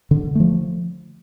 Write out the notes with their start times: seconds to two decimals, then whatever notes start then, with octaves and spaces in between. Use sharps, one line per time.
0.11 D3
0.35 F3 A3